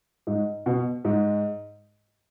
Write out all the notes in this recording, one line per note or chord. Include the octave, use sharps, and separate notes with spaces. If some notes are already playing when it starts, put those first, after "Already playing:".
G#2
B2
G#2